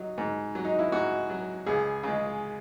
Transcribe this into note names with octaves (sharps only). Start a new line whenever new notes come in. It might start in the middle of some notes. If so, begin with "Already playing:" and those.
Already playing: F#3 D#4
G#2
F#3
D#4
E4
G#2 F#4
F#3
C#2 G#4
C#3 G#3